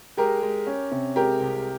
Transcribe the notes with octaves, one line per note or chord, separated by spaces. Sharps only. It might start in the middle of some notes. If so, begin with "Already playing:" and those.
G#3 G4 A#4
G#3
C#4
C3
G#3 G4 A#4
C2